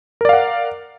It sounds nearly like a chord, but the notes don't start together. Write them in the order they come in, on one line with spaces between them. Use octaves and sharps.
A#4 D5 F5 F#5